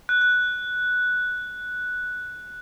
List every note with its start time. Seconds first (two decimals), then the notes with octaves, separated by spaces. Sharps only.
0.09 F#6
0.21 F#6